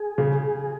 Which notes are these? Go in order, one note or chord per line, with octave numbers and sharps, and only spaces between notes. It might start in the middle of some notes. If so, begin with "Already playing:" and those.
Already playing: G#4
C#3